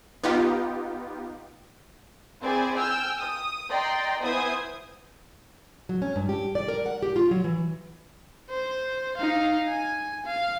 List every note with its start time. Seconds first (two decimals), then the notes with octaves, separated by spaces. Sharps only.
0.23 B3 D#4 F4 G4
2.41 C4 E4 G#4 C5 D5 G#5
2.75 G5 G#5 E6 F6 G6
3.20 D#6
3.69 D5 D#5 G5 A#5 C6
4.22 B3 E4 C5 G#5 D#6 G#6
5.89 F#3
6.02 C#4
6.16 G2
6.29 G4
6.55 D5
6.68 A#4
6.86 F#5
7.02 G4
7.16 F4
7.31 F#3
7.44 E3
8.50 C5
9.17 D#4 F5
9.68 G#5
10.26 F5